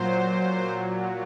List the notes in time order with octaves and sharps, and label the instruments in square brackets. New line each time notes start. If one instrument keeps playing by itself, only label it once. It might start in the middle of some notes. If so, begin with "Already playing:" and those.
Already playing: [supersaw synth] A#2 F#3 C5